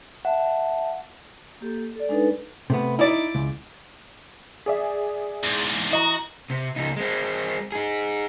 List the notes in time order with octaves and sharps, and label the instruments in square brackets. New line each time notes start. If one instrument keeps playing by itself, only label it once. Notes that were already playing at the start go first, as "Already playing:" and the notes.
[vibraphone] E5 A5 [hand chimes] F#5
[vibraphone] A#3 G4 A4
A4 D5
G#3 D4 D#4 A4 B4
[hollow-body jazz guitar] C3 A3 B3
[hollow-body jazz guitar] D#4 [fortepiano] E4 D5
[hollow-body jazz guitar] C#2
[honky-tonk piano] G#4 D5 E5
[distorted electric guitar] E2 G#2
[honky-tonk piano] E3 D#5 A#5 [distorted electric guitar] F#4
[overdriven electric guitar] C3
C#2 D#4
G#3 C4
D#4 G#4